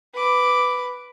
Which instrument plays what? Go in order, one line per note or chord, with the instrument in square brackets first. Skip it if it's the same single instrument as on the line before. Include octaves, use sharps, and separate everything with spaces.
[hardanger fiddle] B4 D6